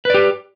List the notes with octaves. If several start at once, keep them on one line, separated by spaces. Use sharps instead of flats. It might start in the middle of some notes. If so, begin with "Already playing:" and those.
G4 B4 D5